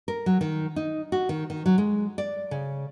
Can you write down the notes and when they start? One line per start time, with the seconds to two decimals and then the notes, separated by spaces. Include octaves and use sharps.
0.08 A#4
0.26 F#3
0.41 D#3
0.76 D#4
1.12 F#4
1.29 D#3
1.50 D#3
1.66 F#3
1.78 G#3
2.18 D5
2.51 C#3